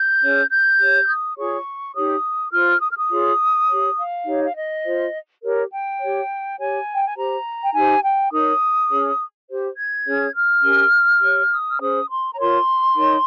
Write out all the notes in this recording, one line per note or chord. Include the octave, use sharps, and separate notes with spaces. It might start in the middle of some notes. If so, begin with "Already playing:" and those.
Already playing: G6
C#4 G#4 C#5
G6
G4 C#5
F6
D#6
F4 G#4 C#5 C#6
D#4 G4 C#5 D#6
F4 C5 F6
D#6
F6
D#6
F4 G#4 C#5
G4 C#5
F5
D#4 G4 C#5
F5
D#5
F4 C5
G4 A#4 C#5
G5
G4 C#5
G4 C#5 G#5
G5
G#5
G4 C5 A#5
G5
D#4 G4 C5 G#5
G5
D#4 A#4 C#5 D#6
C#4 G#4 C#5
G4 C5
G#6
C#4 G#4 C#5
F6
C#4 G4 A#4
G4 C#5
D#6
F6
C#4 G#4 C5 D#6
C6
A#5
F4 A#4 C#5 C6
D#4 A#4 C#5